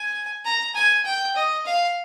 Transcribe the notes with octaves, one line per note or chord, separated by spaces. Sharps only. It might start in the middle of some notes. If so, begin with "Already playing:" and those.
Already playing: G#5
A#5
G#5
G5
D#5
F5